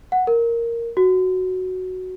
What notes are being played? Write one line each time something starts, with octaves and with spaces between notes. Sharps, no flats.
F#5
A#4
F#4